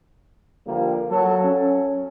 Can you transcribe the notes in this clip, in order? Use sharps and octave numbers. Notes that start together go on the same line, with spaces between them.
D3 F3 G3 A#3
F#3 A4
C#4